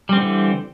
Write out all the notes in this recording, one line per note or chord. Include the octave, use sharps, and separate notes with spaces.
D3 E3 G3 C4